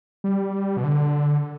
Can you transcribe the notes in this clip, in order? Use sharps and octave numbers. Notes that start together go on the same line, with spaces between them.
G3
B2
D3